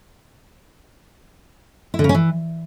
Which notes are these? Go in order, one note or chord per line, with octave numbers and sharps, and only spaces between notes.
E4
D3
C#3
C#4
E3